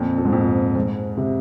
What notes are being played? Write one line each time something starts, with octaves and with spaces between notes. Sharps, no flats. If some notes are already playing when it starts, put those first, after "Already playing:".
Already playing: F2 A#2
F2
G#2
F2 A#2
G#2
C3